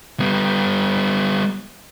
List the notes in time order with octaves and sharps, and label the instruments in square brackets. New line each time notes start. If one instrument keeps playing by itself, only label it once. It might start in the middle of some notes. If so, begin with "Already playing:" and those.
[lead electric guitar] G3 B3